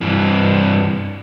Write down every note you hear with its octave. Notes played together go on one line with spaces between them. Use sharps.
G2 E3